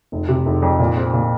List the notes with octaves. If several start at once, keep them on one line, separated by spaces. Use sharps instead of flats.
F1
C3
F1
F2
A#2
C4
A#2